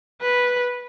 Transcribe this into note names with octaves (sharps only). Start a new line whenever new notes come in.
B4